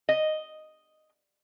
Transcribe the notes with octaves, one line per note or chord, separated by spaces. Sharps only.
D#5